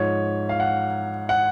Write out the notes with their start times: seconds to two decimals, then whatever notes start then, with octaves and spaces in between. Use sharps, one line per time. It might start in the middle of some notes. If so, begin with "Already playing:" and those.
Already playing: G#2 F3 C#5
0.49 F5
0.60 F#5
1.29 F#5